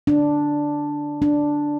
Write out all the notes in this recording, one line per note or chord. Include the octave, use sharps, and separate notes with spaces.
D4
D4